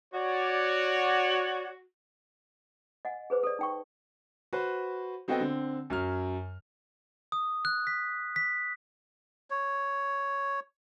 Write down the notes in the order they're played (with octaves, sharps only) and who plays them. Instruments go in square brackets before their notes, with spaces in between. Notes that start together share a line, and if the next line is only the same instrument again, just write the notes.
[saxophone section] F#4 [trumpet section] C#5 D5
[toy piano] D#5 F#5 G#5
G#4 B4 C5 D6
A4 D5
D#4 G5 C#6
[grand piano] F#4 B4 C5
B3 C4 F#4 A4 D#5 G5
D3 C4
F#2 F#3 F6
[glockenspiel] D#6
F#6
B6
B6
[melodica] C#5